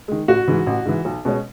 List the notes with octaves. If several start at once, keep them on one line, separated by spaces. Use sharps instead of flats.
D#3 G#3
A1 F#4
G#2 E3
A1
G#2 E3
B1
B2 G#3 C#4